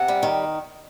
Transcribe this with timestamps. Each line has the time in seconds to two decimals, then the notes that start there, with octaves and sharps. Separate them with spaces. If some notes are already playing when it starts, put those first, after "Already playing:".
Already playing: C3 F#5
0.08 G3
0.23 D#3